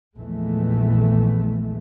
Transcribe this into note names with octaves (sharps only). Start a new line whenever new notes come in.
A#1 E2 E3 G#3 A3